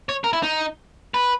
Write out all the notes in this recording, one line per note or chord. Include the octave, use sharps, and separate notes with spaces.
C#5
A#4
E4
D#4
B4